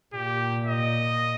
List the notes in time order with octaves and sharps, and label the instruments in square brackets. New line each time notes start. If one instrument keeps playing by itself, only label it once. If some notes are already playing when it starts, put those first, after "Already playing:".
[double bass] A#2 [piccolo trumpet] G4
[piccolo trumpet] D#5